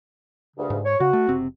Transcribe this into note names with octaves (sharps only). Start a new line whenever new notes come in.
D2 G2 C#3
G#2
C#5
C#3 F#4
A3
F#1 C3 C4